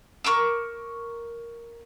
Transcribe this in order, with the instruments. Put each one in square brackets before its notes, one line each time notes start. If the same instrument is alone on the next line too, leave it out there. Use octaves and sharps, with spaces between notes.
[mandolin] A#4 C#6 D6 E6